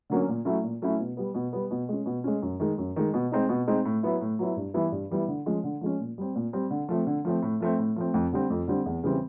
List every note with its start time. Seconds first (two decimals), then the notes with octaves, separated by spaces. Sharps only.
0.10 D3 F#3 A#3 C#4
0.28 A#2
0.45 F#3 A3 C#4 E4
0.63 A#2
0.82 F#3 A3 C#4 E4
1.00 B2
1.17 G3 B3
1.34 B2
1.53 G3 B3
1.71 B2
1.89 G#3 C#4
2.06 B2
2.24 G#3 C#4
2.42 F#2
2.60 D#3 G#3
2.78 F#2
2.96 D#3 G#3
3.14 B2
3.32 G#3 C4 D#4
3.49 B2
3.68 G#3 C4 D#4
3.85 A2
4.03 F#3 B3 E4
4.21 A2
4.39 F#3 B3 E4
4.56 G2
4.74 E3 G3 B3 E4
4.92 G2
5.10 E3 G3 B3 E4
5.28 D3
5.46 F3 G#3 C#4
5.64 D3
5.81 F3 G#3 C#4
6.00 A#2
6.18 G3 C4
6.35 A#2
6.53 G3 C4
6.70 D3
6.89 F3 A3 C4
7.07 D3
7.25 F3 A3 C4
7.42 A2
7.60 F3 A3 C4
7.79 A2
7.96 F3 A3 C4
8.14 F2
8.32 D3 G3 C4
8.50 F2
8.68 D3 G3 C4
8.86 E2
9.03 C#3 E3 G3 C4